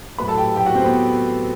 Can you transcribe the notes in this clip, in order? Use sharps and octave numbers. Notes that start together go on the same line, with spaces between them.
A2 F#3 A3 B4 B5
A4 A5
G4 G5
A2 F#3 A3 G4 G5
F#4 F#5
C4 C5
B3 B4